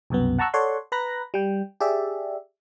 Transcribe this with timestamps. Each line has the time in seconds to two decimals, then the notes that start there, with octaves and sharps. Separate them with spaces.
0.10 C2 F#2 B2 B3
0.39 F#5 A5 A#5 C#6 E6 F#6
0.54 A4 C#5 D5 F#5 C6
0.92 B4 A#5 B5 F#6 A#6
1.34 G3 G5
1.80 G4 G#4 D5 E5